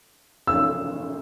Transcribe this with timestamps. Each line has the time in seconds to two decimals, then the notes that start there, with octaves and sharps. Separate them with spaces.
0.47 E6